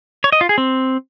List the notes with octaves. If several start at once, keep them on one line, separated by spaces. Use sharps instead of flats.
C#5
D#5
F4
G#4
C4